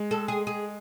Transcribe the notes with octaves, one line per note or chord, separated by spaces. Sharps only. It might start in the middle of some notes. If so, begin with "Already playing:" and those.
Already playing: G#3
A4
G#4
G#4